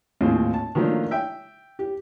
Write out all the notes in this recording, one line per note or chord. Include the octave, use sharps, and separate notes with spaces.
G#1 D#2 A2 C4 F4
A5
D#3 F3 F#3 A3 A#3 D4
E5 G5
G4